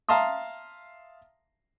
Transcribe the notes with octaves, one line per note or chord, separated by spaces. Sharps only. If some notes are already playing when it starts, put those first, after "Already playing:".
E5 F5 A5 A#5 C6 D#6